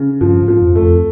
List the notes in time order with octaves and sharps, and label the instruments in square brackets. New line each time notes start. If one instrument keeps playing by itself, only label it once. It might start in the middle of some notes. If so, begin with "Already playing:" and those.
Already playing: [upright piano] C#3
[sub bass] G2 [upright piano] F3
[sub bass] G#2
[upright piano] F3
[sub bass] F2
[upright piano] A3
[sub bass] F2